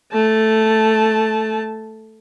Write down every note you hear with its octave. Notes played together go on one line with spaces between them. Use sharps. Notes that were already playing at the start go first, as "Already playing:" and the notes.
A3 A5